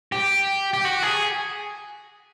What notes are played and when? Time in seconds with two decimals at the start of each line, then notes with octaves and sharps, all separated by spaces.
0.12 G4
0.74 G4
0.85 F#4
1.03 G#4